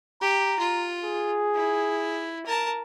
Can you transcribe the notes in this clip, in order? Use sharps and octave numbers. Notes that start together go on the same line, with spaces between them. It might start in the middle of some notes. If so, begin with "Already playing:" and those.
G4 A#5
F4
G#4
E4
A#4 A5